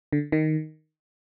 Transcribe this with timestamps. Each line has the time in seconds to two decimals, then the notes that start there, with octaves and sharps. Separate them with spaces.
0.13 D3
0.32 D#3